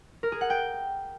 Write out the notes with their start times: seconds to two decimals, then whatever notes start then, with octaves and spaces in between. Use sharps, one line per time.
0.23 A#4
0.32 G#4
0.41 F#5
0.50 G5